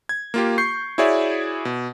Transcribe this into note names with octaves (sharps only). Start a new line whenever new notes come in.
G#6
A#3 F4 G4
C#6 G6 C7
E4 F#4 G#4 C#5 D5 E5
B2